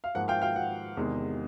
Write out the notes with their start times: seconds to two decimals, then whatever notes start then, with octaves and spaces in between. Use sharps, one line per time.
0.04 F5
0.14 G#2 F3 A#3 F#5
0.28 F5 G5
0.42 F5 G5
0.56 F#5
0.97 E2 C3 D#3 G#3